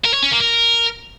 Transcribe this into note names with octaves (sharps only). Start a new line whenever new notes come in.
A#4
C#5
C#4
A#3
A#4